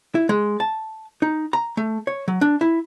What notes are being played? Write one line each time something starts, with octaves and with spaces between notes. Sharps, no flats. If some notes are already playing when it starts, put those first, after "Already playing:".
E4
G#3
A5
D#4
A#5
A3
C#5
F#3
D4
E4